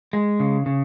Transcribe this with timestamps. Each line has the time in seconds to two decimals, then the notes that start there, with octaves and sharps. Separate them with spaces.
0.13 G#3
0.40 C#3
0.66 C#3